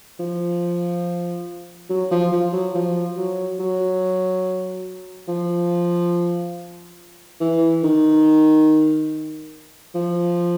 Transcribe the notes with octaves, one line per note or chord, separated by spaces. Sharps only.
F3
F#3
F3
F3
F#3
F3
F#3
F#3
F3
E3
D#3
F3